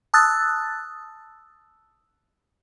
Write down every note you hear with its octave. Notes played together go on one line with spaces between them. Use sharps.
A5 D#6 E6 F#6 A6